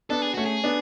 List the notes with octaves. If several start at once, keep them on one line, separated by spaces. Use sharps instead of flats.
B3 D4 A4
G#4
A3 C#4 F#4
G#4
B3 D4